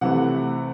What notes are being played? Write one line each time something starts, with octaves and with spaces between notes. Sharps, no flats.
C3 E3 A3 F#5